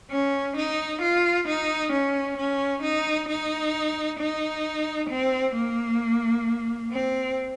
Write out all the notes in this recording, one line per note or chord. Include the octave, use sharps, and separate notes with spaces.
C#4
D#4
F4
D#4
C#4
C#4
D#4
D#4
D#4
C4
A#3
C4